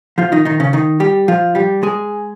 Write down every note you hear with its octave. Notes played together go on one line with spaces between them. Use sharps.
F3 F4
D#3 D#4
D#3 D#4
C#3 C#4
D#3 D#4
G3 G4
F3 F4
G3 G4
G#3 G#4